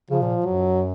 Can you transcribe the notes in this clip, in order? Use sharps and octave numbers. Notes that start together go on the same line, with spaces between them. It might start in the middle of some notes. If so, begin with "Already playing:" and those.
C#3 F3
A#2
F#2 F#3